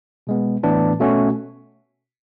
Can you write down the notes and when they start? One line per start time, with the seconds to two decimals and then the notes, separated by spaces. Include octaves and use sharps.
0.27 B2 G#3 B3
0.63 A2 E3 B3 D4
1.00 B2 A3 C#4 F#4